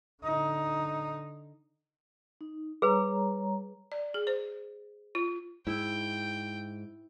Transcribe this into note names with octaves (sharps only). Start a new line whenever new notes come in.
D3 D#4
D#4
G3 G#4 B4 C#5 A#5
D5
G#4
C5
F4
G#2 E4 G5